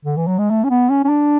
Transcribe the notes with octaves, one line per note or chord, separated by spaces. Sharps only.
D3
E3
F#3
G#3
A3
C#4
B3
C#4
C#4
D4